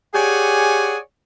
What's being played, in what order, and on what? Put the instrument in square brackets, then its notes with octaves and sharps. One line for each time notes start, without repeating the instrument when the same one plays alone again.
[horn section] G4 G#4 C#5 D5 F#5 G#5